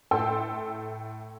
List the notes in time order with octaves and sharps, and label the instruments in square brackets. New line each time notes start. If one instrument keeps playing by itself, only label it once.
[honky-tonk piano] A2 A4 G5 C6 E6